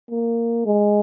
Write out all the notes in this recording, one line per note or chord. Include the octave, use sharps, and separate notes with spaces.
A#3
G#3